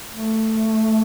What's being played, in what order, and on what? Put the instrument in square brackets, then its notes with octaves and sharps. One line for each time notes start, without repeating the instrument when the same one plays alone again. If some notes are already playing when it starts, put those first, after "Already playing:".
[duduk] A3